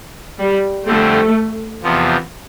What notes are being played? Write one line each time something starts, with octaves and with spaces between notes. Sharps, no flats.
G3
F2 D3 G3 A3 C4
E2 C3 F3 B3